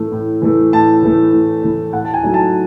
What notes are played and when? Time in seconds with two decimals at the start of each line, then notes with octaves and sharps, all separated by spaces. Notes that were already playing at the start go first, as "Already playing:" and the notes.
Already playing: A2 E3 A3
0.12 A2
0.42 E3 A3
0.73 A2 A5
1.03 E3 A3
1.33 A2
1.63 E3 A3
1.93 A2 F#5
2.05 A5
2.14 G#5
2.23 F#3 A3 D#4
2.34 A5